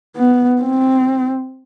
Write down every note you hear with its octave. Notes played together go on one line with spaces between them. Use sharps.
B3
C4